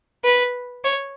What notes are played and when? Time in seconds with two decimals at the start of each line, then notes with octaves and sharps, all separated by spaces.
0.24 B4
0.84 C#5